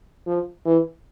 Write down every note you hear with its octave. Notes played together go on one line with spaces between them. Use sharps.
F3
E3